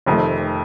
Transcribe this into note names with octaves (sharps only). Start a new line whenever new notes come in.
F1 F2 D#3 A3